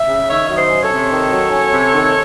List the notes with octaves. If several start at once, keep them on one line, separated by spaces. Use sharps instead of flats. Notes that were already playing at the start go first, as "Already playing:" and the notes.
Already playing: E5
C#3
D#3 C#5 E5
F#3 E5
C5 D#5
C#4
A4 C#5
C3
D#3
F#3
C#4
C3
D#3